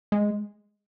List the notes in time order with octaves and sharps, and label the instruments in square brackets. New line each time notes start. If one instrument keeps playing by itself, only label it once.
[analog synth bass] G#3